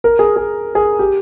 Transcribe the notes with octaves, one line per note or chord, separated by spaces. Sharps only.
A#4
G#4
G#4
G#4
G4